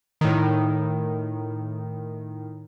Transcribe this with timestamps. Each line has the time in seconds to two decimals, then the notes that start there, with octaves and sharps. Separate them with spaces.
0.21 A2 D#3